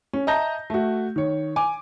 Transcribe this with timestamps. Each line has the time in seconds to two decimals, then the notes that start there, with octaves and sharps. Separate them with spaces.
0.13 C#4
0.27 D#5 E5 A5 A#5 G6 A#6
0.70 A3 F#4
1.16 D#3 C#5
1.56 G#5 D6